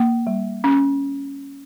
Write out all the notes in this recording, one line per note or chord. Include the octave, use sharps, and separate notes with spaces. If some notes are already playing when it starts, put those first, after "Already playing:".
Already playing: A#3
G3
C#4